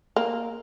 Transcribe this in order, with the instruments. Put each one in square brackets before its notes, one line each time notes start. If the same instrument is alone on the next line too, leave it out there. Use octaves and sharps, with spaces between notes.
[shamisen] A#3